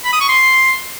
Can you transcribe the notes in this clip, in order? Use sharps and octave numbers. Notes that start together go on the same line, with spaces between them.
B5
D#6
C#6
C6